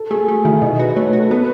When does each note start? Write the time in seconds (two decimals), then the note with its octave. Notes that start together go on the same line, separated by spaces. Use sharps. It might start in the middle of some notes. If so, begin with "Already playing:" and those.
Already playing: A4
0.10 A3 G#4
0.28 A3 F#4
0.45 D#3 E4
0.62 B2 D#4
0.79 F#4 B4
0.96 A3 C#5
1.08 B4
1.13 F#4
1.20 A4
1.31 B3 B4